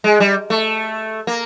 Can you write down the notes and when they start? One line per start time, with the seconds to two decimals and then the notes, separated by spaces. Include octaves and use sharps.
0.04 G#3
0.20 G3
0.50 A3
1.27 A#3